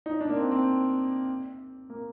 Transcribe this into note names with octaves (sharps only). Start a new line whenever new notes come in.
D#4
D4
A#3
C4
C4
A#3